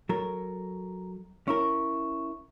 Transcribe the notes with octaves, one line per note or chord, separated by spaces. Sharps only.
F#3 A4 A#4 A#5
C#4 E4 A#4 C#6